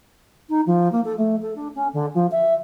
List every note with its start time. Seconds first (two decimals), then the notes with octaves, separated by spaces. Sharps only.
0.49 D#4
0.66 F3
0.92 A#3
1.05 A4
1.17 A3
1.42 A4
1.55 D4
1.75 C#4
1.93 D3
2.14 F3
2.31 E5